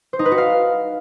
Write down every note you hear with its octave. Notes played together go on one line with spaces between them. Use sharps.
C5
D#4
B4
F#4
F5